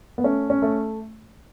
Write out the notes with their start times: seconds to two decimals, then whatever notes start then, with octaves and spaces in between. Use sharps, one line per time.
0.18 B3
0.24 A3 C#4
0.50 C#4
0.62 A3